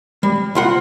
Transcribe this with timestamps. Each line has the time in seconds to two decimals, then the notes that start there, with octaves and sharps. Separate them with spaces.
0.23 G3
0.55 C2 F4 F#5